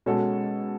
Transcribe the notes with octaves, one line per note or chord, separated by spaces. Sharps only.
B2 G#3 C#4 F#4 A4